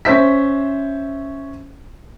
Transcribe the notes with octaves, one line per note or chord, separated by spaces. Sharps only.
C#4 C5 E5 B6